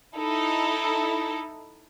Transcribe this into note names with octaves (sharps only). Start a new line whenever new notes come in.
D#4 E4 A4